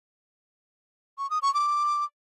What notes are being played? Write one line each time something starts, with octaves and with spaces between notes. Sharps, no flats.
C#6
D#6
C#6
D6